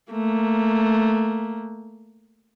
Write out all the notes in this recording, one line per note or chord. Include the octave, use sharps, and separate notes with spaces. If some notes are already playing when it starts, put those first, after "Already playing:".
A3 A#3